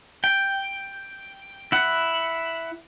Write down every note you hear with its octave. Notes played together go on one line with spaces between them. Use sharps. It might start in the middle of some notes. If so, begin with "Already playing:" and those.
G5
E4 F#5